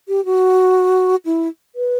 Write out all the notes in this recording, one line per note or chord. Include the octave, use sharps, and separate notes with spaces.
G4
F#4
E4
B4